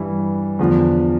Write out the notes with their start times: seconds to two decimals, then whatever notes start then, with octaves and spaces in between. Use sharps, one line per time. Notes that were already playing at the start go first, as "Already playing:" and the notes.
Already playing: G2 E3 G3
0.59 E2 D3 F3